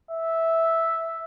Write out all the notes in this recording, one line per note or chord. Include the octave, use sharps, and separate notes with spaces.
E5